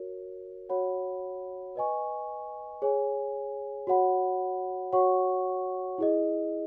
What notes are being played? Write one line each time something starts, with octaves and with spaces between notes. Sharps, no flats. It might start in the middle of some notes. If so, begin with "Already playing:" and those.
Already playing: F#4 A#4 C#5
F#4 C#5 F#5 B5
B4 D#5 G#5 C#6
G#4 C#5 G#5
F#4 C#5 F#5 B5
F#4 C#5 F#5 C#6
E4 G#4 D#5